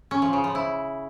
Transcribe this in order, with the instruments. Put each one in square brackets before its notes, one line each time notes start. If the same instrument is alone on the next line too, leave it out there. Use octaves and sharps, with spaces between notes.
[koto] C#4
F3
C#3
F3
E4